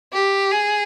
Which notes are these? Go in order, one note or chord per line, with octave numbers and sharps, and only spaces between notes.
G4
G#4